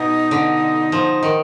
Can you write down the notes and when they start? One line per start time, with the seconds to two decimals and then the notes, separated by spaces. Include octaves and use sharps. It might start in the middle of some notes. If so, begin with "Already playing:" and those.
Already playing: B2 D#4
0.31 D3
0.92 F3
1.23 D#3